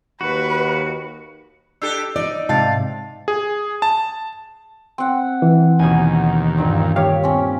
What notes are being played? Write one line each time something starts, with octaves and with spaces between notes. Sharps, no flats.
D#2 F#4 B4 C#7
D4 G4 A4 E6
D#4 D5
G#2 C3 F5 A5 A6
G#4
A5
C4 F#5
E3
D#2 B2 G#5
G2 A#2
D#2 G4 C#5 F5
C4 C#4